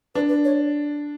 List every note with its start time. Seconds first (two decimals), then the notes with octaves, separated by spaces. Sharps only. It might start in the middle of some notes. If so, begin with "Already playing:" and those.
0.15 D4 B4
0.29 B4
0.45 C#5